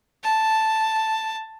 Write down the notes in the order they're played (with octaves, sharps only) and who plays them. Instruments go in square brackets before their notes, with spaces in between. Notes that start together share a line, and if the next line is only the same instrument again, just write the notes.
[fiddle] A5